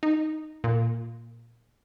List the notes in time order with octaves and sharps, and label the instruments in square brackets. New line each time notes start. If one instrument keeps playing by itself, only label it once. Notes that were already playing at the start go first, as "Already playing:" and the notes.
[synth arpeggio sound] D#4
A#2